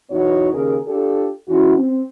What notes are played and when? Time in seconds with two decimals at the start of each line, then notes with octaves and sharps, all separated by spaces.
0.10 E2 B3 D#4 F#4 C#5
0.52 D#2 C#3 G#4 A#4
0.86 D4 F4 G4 A4
1.48 E2 E3 C#4 E4 F#4
1.77 C4